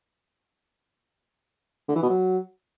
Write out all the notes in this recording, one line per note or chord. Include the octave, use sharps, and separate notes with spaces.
D3
E3
B2
F#3